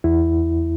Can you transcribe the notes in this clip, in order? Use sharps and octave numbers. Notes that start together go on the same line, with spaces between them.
E2 E4